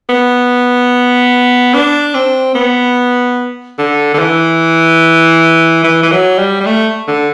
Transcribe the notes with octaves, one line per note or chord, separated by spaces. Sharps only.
B3
D4
C4
B3
D3
D3
E3
E3
E3
F#3
G3
G3
A3
D3